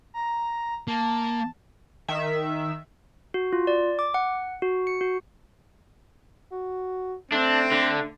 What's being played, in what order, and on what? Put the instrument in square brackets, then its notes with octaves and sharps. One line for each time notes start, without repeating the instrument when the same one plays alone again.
[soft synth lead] A#5
[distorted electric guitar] A#3 [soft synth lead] A5
[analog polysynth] D#3 E5
[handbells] F#4
F4
D5
D6
F#5
F#4
C#7
F#4
[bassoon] F#4
[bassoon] A3 [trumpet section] C4 [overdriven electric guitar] D4
[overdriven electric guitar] D3